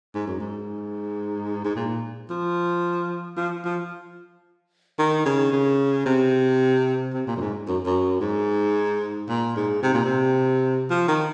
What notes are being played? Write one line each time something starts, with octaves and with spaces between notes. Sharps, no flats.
G#2
F#2
G#2
G#2
A#2
F3
F3
F3
D#3
C#3
C#3
C3
C3
A#2
F#2
G#2
F#2
F#2
G#2
A#2
G#2
C3
A#2
C3
F3
D#3